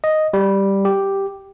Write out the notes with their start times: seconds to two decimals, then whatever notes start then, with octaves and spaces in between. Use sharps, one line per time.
0.04 D#5
0.33 G3
0.85 G4